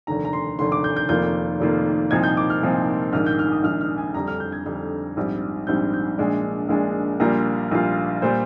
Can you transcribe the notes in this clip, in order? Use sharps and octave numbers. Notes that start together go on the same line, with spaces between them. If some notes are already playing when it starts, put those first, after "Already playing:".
F1 D#2 D3 A#5
A#5
C6
F1 D#2 D3 C6
D6
G6
G6
F1 F2 D#3 A#3 F4 G6
F1 F2 D#3 A#3 F4
C2 A#2 F3 C4 D#4 G#6
G6
D6
F6
C2 A#2 F3 C4 D#4
A#1 G#2 D#3 F6
G6
F6
D#6
A#1 G#2 D#3 F6
F6
G#5
F2 D3 G3 A#5
F6
G6
G#6
F2 D3 G3
A#1 G#2 G3 C4
A#1 G#2 G3 C4 G6
G6
A#1 A#2 G#3 D4
A#1 A#2 G#3 D4
A#1 A#2 G3 A#3 F4 A#5
A#1 A#2 G3 A#3 F4
A#2 G3 C5